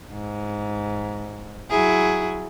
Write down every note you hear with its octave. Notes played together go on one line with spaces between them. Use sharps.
G#2
F#3 E4 G#4